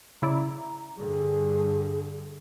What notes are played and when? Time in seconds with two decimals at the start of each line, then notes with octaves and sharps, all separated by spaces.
0.22 C#3 E4 D5 A#5
0.97 G2 D3 G#4